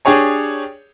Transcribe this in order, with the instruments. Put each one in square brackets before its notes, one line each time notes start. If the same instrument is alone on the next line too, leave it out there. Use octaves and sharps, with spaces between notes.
[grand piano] D4 G4 G#4 C#5 G#5